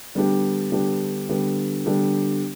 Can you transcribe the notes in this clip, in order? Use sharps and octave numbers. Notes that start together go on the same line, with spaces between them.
D3 G3 B3 D4 G4
D3 G3 B3 D4 G4
D3 G3 B3 D4 G4
D3 G3 B3 D4 G4